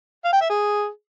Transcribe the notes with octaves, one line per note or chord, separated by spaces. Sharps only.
F5
G5
E5
G#4